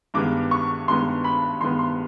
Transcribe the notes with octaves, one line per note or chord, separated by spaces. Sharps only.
G2 D#3 G#3 B3 D6
C#6
G2 D#3 G#3 B3 C6
B5
G2 D#3 G#3 B3 C6
C6